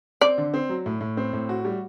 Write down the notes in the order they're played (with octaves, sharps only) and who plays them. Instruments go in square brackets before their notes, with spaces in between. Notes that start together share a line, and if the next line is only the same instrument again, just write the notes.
[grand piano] C4 [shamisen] D5
[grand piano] D3
C4
F#3
A2
A2
C4
A2
F#4
G3